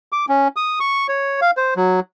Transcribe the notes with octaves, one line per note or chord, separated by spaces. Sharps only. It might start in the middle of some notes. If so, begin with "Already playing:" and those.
D6
C#4
D#6
C#6
C#5
F5
C5
F#3